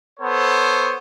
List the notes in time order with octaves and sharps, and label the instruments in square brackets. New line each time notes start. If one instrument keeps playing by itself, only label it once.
[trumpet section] B3 A4 C5 C#5